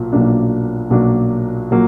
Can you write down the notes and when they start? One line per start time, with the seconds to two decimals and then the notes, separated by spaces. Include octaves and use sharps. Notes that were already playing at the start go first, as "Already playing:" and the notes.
Already playing: B1 A#2 F#3 A#3
0.12 B1 A#2 F#3 A#3 D4
0.90 B1 A#2 F#3 A#3 D4
1.71 A#2 F#3 A#3